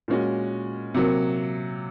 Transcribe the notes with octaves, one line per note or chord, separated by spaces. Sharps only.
A#2 G#3 C#4 F#4
C3 F#3 A#3